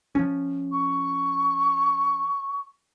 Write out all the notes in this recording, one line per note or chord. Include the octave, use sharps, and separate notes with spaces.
F3 C#4
C#6